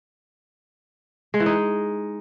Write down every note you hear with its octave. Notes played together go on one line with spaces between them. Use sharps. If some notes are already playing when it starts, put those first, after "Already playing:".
G#3
E3
D#4